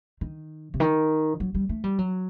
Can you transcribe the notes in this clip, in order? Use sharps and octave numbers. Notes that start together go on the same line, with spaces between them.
D#3
C3
D#3
F#3
G3
A3
G3
F#3